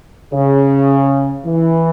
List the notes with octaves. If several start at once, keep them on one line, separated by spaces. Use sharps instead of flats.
C#3
E3